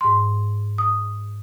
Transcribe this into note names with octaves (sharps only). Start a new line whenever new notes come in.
G#2 C6
D#6